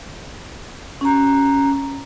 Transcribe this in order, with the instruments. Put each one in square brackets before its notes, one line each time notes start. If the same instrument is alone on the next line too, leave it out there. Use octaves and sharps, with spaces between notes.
[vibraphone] C#4 A#5